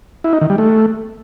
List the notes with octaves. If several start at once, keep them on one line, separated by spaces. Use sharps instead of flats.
E4
D#4
D#3
G3
A3